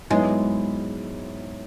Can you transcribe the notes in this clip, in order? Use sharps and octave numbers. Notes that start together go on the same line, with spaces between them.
G#2 F#3 G#3 B3 E4